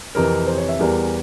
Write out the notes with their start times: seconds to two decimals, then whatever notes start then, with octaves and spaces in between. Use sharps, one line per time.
0.15 F2 C3 E3 A#4
0.47 C5
0.57 C#5
0.69 E5
0.79 E2 E3 G3 A#4